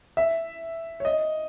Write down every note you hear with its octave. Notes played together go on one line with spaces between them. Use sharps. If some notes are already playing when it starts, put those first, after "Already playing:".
E5
C#5
D#5